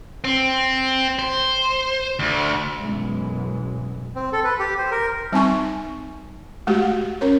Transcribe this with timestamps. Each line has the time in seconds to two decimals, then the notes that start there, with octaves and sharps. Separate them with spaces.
0.24 C4
1.19 C5
2.19 D2
2.78 B1 F#2 E3 F#3 G#3
4.15 C4
4.33 A4
4.44 B4
4.60 G4
4.78 C5
4.91 A#4
5.32 G3 C4 D#4 G#5 C#6
6.67 G#3 A3 F#4 G4
7.21 C#4 A#4 C#5